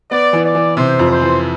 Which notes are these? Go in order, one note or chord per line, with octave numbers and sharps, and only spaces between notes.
B3 D5
E3
D5
E3
C3 C5
F2
C5
E3